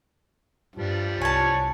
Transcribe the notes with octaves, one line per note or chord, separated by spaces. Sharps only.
G2 F3 G3 D4
C2 C#5 G#5 A5